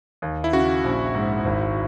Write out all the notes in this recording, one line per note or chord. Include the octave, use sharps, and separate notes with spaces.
D#2
E4
C#3 F#4
A#1
G#2
G#1